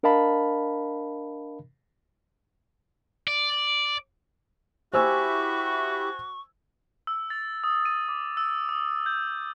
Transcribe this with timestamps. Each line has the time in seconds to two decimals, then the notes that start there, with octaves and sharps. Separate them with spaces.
0.03 D4 A#4 D#5 F5 A5 B5
3.28 D5
4.93 E4 F#4 G4 C5 E5 G#5 C#6 E6
7.07 E6
7.30 A6
7.64 D#6
7.85 D#7
8.09 D6
8.37 E6
8.69 D#6
9.06 G6